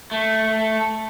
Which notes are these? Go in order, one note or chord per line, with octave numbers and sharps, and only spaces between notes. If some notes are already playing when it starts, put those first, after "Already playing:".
A3